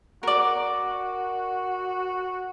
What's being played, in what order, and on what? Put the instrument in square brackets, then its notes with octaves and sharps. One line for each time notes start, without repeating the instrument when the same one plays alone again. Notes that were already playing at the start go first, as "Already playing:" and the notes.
[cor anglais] F#4 [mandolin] A#4 D5